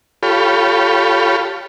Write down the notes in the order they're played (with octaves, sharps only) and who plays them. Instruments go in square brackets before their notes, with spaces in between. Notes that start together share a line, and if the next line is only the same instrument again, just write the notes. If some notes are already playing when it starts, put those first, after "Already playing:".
[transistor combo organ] F4 G4 A4 C#5 B5